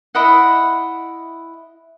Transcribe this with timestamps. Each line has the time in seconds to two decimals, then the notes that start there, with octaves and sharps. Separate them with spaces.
0.15 E4 D#5 F#5